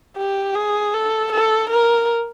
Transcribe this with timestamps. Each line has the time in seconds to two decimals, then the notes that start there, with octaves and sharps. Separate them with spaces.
0.17 G4
0.55 G#4
0.94 A4
1.32 A4
1.70 A#4